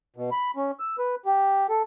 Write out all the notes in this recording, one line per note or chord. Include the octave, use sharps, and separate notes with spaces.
B2
B5
C#4
E6
B4
G4
A4